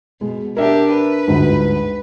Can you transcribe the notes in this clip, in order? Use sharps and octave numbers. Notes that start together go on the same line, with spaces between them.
B2 G#3
D4 G4 A#4 E5
B4
G1 D2 G#2